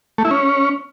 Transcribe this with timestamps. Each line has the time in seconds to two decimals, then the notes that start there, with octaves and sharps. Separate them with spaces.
0.18 A3
0.25 E4
0.31 C#4